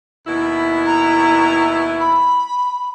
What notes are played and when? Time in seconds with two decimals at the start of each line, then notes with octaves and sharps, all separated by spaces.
0.27 D#2 B2 E4
0.86 A#5
2.00 B5